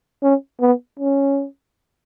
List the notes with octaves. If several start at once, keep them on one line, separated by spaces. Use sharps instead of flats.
C#4
B3
C#4